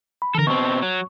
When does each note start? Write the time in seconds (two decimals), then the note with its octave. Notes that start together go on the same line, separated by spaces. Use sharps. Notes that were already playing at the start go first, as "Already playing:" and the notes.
0.22 B5
0.35 D3 E3 A4 A#4
0.47 B2 C4 C#6
0.83 F#3